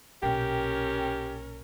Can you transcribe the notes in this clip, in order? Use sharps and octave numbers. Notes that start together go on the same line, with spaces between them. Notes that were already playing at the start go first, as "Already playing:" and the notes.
B1 A#2 C#4 G4 A#4 G5